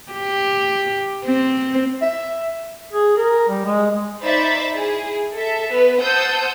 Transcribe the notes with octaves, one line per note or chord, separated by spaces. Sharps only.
G4
C4
E5
G#4
A#4
G3
G#3
D#4 C5 D5 E5 B5 A6
E4 G#4
A4 E5
B3 B4
C5 F#5 A5 D#6 E6 G6